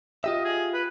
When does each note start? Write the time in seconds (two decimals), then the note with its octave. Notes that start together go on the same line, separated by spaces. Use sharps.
0.24 F4 G4 D#5 E5
0.45 G#4
0.74 B4